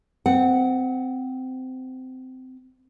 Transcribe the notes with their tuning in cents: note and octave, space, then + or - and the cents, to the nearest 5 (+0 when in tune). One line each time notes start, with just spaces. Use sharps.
C4 -20 F#5 +0